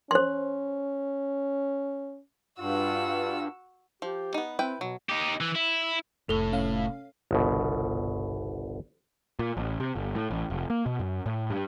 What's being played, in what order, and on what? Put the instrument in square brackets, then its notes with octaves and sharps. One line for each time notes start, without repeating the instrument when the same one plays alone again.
[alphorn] C#4 [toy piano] C5 C6
[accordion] G2 [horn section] F4 [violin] F#4 E6
[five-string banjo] F3 [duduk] G4
[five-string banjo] B3 D#4
[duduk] C4 [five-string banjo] E4 B4 G5
[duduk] B2 [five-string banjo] F#3
[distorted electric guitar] D#4 G4
E3
E4
[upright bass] F1 [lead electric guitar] A2 [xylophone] A4 G7
[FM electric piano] C#4 F5
[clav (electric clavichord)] G1 C2 B2
[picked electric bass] A#2
A1
C3
G1
A2
A1
F1
A#3
B2
F#2
A2
G2